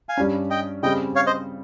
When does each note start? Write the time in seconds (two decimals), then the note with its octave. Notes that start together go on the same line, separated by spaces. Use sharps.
0.09 F5 G#5
0.17 G2 G3 C#4
0.50 D#5 G5
0.83 C#3 G3 C4 D#5 G5
1.16 C#5 F5
1.27 C5 D#5